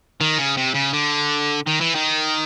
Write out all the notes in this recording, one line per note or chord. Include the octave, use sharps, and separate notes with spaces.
D#3
C#3
C3
C#3
D3
D#3
E3
D#3